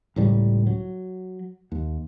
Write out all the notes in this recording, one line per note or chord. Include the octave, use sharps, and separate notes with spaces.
C#2 A2 G3
F#3
D#2